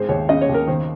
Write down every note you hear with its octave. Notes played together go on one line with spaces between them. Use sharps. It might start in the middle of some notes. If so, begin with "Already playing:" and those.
Already playing: G#1 G#3 C5
D#2 C#5
C#3 D#5
C#5
D#2
A#4
D#3 C5